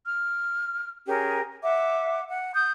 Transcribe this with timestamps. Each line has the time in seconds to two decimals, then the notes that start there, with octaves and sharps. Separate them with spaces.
0.06 F6
1.07 C#4 G4 G#4 A#4
1.63 E5 F#5 D6
2.28 F#5
2.54 D#6 G6